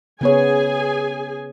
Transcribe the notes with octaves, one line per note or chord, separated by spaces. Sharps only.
C#3 B3 G#4 C#5 G#5